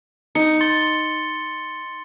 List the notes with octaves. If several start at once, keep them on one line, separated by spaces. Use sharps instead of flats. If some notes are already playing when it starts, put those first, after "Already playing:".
D#4 C#7
C6 A6 G7